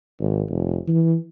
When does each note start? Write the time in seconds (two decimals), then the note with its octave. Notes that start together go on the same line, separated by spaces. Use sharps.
0.20 G#1
0.49 F1
0.88 E3